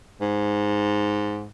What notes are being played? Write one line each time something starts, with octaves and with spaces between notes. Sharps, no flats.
G#2